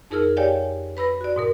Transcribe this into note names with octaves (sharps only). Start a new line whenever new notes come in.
F2 D#4 G#4 A#4 E6 F6
G4 C#5 D5 F5 G5 G#5
B4 B5 E6 A#6
F#4 D5
G#2 B2 A#4